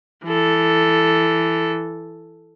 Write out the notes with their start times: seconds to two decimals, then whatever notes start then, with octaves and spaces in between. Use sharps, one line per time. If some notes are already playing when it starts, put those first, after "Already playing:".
0.24 E3 A4